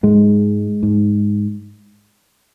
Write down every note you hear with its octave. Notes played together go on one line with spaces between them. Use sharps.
G#2 G#3
G#2